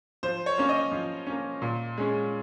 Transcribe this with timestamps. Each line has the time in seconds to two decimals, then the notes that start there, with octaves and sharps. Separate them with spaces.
0.23 F3 C5
0.46 C#5
0.58 A#3 C#4
0.69 D#5
0.92 F3
1.27 A#3 C#4
1.62 A#2
1.97 G#3 C#4